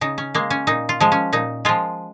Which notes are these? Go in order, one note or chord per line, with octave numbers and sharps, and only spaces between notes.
C#3 D#4
C#4
G#3 A#3
C#4
A#2 D#4
F4
F3 G#3
C#4
A#2 D#4
F3 G#3 F4